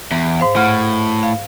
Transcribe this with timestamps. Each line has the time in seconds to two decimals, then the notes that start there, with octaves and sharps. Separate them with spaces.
0.11 E2
0.40 G#2 C5 F5
0.56 A2 F#5 F6
1.23 F5